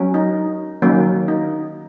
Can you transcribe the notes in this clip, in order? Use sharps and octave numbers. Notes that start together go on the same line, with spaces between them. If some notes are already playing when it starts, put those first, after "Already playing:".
Already playing: F#3 C#4
D#4
D#3 F#3 A#3 C#4
D#4